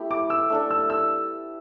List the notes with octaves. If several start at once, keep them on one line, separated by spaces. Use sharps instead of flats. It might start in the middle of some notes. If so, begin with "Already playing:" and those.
Already playing: A3 B3 E4 G4 E5
D6
E6
A3 D4 A4
E6
E6